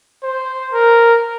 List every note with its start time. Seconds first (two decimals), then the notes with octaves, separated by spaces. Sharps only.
0.23 C5
0.72 A#4